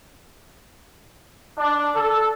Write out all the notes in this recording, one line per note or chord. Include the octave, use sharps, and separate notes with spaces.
D4
A4